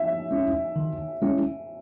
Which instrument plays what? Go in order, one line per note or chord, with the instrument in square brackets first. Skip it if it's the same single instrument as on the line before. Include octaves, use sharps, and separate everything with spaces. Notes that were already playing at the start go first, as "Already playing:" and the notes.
Already playing: [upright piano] E5
[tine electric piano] G#3 C#4 E4
D#3
G#3 C#4 E4